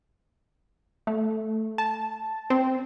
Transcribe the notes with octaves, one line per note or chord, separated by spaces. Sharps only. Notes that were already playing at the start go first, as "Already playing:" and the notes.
A3
A5
C4